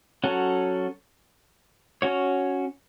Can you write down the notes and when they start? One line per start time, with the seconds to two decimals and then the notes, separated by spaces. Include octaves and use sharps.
0.24 F#3 C#4 F#4 A4 C#5
2.02 C#4 F#4 C#5